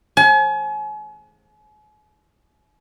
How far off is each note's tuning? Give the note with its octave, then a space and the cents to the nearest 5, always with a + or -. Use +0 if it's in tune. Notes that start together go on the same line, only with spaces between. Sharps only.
G#5 +40